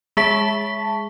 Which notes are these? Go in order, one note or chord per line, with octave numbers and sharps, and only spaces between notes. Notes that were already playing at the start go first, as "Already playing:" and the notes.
G#3 G#4 E5 A5 C#6 B6